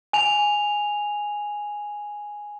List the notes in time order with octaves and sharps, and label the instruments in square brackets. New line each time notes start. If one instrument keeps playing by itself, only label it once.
[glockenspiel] G#5 F7